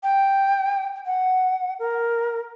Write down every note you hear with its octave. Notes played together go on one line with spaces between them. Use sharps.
G5
F#5
A#4